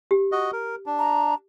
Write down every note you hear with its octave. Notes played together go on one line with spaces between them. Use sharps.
G4
F#4 D#5
A#4
D4
A#5